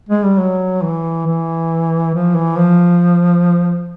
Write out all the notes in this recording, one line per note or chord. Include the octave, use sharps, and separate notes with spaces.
G#3
G3
F#3
E3
E3
F3
E3
F3